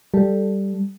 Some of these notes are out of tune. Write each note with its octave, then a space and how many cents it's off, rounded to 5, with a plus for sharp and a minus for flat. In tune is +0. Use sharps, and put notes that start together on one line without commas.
G3 +0 A4 +0